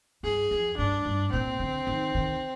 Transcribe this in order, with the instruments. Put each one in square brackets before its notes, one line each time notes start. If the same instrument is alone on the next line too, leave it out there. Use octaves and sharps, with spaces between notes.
[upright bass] G2 [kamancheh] G#4
[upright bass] F2
[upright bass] G2 [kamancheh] D4
[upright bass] G2
[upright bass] A#2 [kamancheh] C4
[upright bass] D3
D#3
D#3